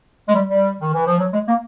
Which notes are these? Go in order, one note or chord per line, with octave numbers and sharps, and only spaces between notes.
G#3
G3
G3
D#3
E3
F3
F#3
G#3
A#3